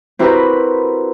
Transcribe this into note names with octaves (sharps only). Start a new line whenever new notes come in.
C4 E4 F#4 G4 A#4 B4